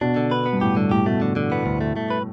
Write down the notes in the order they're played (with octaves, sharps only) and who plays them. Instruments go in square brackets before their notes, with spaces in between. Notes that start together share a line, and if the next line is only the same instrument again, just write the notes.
[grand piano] B2 [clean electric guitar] D4
[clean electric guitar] D3
B4
B3
[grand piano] G2
[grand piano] A2 [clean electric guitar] G4
[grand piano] G2 [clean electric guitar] D3
[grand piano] A2 [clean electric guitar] G4
[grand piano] B2 [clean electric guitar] A3
[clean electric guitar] D3
D3
B3
D2
A3
A3
B4